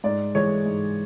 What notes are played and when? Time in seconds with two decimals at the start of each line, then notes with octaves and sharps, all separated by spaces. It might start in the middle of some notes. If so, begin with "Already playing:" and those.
0.04 G#2 D5
0.35 E3 G#3 C#5
0.66 G#2